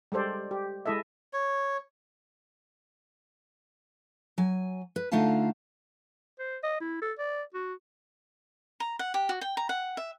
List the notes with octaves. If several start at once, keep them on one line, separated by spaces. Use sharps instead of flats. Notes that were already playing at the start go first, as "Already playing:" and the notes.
G3 G#3 A4 C5 D5
G4
G#3 E4 A4 D#5 E5
C#5
F#3 G#5
B4
D3 A3 D#4 F4 F5 A5
C5
D#5
E4
A4
D5
F#4
A#5
F#5
G4
F#4
G5
A#5
F#5
E5